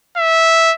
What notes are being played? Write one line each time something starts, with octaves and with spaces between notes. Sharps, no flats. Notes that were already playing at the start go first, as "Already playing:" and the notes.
E5